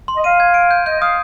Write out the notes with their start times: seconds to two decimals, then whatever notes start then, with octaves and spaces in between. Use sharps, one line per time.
0.08 C6
0.15 D#5
0.24 F5 D#7
0.40 G#6
0.54 D7
0.71 G6
0.86 D#5 G6
1.00 F5 D#6